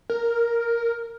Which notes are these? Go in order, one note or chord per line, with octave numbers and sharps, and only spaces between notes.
A#4